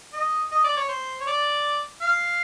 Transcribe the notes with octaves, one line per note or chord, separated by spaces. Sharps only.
D#5
D#5
D5
C#5
C5
C#5
D5
F5